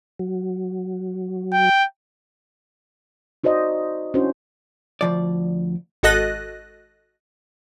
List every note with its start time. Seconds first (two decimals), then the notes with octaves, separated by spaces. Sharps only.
0.19 F#3
1.53 G5
3.44 D#4 F#4 C5 D5 D#5
4.14 C#4 D4 E4 F#4 C5
5.01 D2 F3 D5
6.03 G#1 F#4 A4 D#5 F#6 A#6